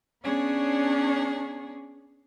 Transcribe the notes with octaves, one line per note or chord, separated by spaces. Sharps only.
B3 C#4 D4 G#4 C#5